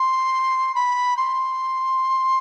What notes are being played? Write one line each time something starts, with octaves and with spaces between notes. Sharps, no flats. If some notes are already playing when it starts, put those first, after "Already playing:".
Already playing: C6
B5
C6